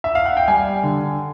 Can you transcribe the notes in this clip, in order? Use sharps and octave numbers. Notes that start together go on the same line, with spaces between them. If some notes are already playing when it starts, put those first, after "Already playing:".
E5
F5
F#5
G5
G3 G#5
D3